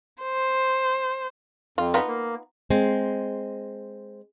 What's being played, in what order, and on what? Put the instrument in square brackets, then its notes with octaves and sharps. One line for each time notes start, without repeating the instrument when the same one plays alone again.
[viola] C5
[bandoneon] F2 [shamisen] F4
[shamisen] B3 D#4 F4
[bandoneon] A#3
[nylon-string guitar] G#3 C4